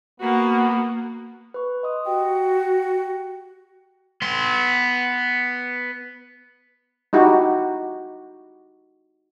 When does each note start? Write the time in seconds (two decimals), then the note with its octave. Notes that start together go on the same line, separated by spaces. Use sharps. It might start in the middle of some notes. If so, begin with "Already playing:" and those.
0.20 A#3 B3 F#4
1.54 B4 C#6
1.83 D#5 C6 D#6
2.06 F#4 G4 G5
4.22 B3 C6
7.13 D#4 E4 F#4 G4